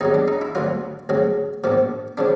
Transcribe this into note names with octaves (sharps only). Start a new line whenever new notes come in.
D#2 C#3 F#3 D#4
D4
D#4
E4
D2 D3 F#3 F4
D2 C#3 F#3
A#1 A#2 F3
C#3 F3 D4